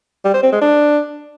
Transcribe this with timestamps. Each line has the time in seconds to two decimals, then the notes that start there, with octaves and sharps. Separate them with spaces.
0.25 G3
0.34 C5
0.43 C4
0.52 G#3
0.61 D4